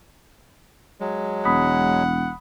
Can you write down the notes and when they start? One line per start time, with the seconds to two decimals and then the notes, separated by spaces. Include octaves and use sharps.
1.00 F#3 G#3
1.45 E1 F#5 B5 D#6 B6